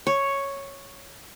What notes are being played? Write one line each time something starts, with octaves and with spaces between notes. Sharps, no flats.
C#5